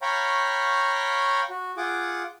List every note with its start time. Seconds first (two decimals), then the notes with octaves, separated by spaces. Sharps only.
0.02 C#5 F5 G5 A#5 B5 C#6
1.50 F#4
1.77 F4 G#4 F#5 D6